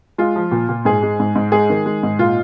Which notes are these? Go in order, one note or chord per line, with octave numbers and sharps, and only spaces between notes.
G#3 F4
F3
A#2
A#2
G#2 G#4
G#3
G#2
G#2
G#3 G#4
D#3
G#3
G#2
A#2 F4